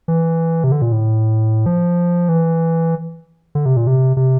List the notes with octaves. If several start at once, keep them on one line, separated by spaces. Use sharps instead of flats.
E3
C3
D3
A#2
A2
F3
E3
D3
C3
A#2
C3
C3